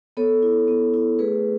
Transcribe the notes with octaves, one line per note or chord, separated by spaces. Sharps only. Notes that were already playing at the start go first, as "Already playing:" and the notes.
B3 A4 C#5
E4
B3
E4
A3 G#4 B4